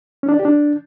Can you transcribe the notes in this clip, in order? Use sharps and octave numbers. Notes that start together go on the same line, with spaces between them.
C#4
D4
D5
G4
D4